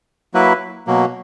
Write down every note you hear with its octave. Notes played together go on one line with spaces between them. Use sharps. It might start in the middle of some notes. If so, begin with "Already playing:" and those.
F#3 A#3 E4 B4
B2 F#3 A#3